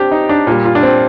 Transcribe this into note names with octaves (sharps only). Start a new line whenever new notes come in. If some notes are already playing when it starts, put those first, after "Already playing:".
Already playing: C4 D4 G4
D#4
D4
A#2 G3
F4
D4
C4